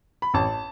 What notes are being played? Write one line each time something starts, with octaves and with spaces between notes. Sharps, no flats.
B5
A1 A5